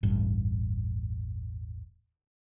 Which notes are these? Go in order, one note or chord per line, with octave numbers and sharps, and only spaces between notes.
E1 A1 G2